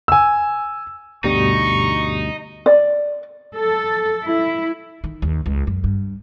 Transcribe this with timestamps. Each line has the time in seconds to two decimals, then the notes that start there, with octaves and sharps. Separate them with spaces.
0.08 G#5 E6
1.24 D2 G2 B2 G3 D#4 C#6
2.66 D5
3.55 A4
4.24 E4
5.04 D#3
5.22 D#2
5.46 C#2
5.67 F#2
5.84 G2